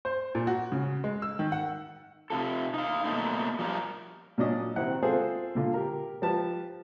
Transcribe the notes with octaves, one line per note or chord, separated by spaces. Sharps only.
C5
A#2
F#4
C#3
G#3
E6
D#3
F#5
C3 F4 A4
D#4 F5
B2 D#3 A3 A#3 D#4
F3 G3 A#4
A#2 F#3 C#4 D4 D5 D#5
C3 D#3 C4 E4 F#5 F#6
C4 F4 G#4 A4 C5
A#2 D3 F4
G4 A#4
F3 G4 B4 A5